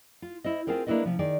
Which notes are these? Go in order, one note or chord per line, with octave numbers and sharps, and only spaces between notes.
F4
E4 C5 D#5
C4 F4 G#4 A#4 C5
A#3 D4 E4 F#4 B4 D#5
C3 F3
D#3 G#4 D5